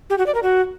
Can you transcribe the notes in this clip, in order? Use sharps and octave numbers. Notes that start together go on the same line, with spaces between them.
G4
F#4
D5
A#4
F#4